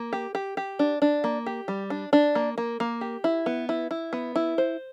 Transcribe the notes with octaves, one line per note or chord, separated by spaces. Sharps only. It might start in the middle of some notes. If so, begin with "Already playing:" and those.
Already playing: A#3
G4
G4
G4
D4
D4
A#3
G4
G3
D4
D4
A#3
A#3
A#3
G4
E4
B3
E4
E4
B3
E4
C5